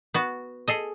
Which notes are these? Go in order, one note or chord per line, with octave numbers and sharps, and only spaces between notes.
B3 F#4
G#4 A4 D#5